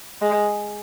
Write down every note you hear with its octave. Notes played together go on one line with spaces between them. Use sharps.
G#3